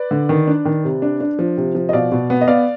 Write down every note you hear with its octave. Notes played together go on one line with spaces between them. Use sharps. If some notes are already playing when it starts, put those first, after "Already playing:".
Already playing: B4 D5
D3
D#3
D4
D#3
C3
D4
D4
F3
C3
F3
D#5
B2 D5 F5
B2
B3
D#5
B3 D5 F5